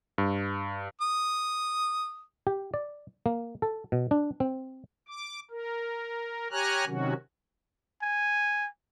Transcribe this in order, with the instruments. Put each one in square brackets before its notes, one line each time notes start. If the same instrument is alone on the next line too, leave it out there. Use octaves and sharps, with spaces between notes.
[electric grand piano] G2
[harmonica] D#6
[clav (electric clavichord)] G4
D5
A#3
A4
B2
D4
C4
[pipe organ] D6
A#4
G4 C#5 G#5 A#5 F6 F#6
C3 D#3 F#3 C#4 F#4
[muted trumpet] G#5